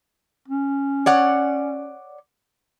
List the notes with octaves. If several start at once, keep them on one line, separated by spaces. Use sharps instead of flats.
C#4
C#5 D5 F#5